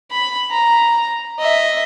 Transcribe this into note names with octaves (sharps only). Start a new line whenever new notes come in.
B5
A#5
D#5 E5